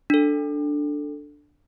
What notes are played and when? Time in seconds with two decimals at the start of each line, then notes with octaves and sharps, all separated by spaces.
0.10 D4 A4